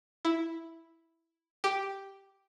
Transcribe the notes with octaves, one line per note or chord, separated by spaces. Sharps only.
E4
G4